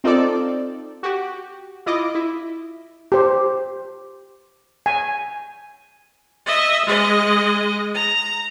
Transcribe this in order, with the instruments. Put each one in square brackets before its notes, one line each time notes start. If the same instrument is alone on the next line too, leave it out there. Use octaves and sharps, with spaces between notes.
[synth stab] C4 D#4 F4 A4 D5
F#4 G4
E4 F4 D#5 D6
E4
[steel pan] G4 C5
G#5
[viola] D#5 E5
G#3 D#5
A#5